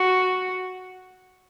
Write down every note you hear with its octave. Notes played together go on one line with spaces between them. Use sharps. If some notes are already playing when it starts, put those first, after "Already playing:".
Already playing: F#4